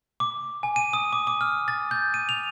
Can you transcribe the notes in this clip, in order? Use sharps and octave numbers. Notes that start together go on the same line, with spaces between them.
D6
G#5
D#7
D#6
D6
D6
F6
A6
G6
D#7
F7